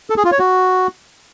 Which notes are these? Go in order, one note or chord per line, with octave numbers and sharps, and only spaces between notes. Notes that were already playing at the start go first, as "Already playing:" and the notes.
A4
G#4
F4
C#5
F#4